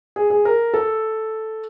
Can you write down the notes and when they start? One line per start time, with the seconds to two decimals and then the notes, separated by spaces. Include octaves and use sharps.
0.16 G#4
0.30 G#4
0.45 A#4
0.74 A4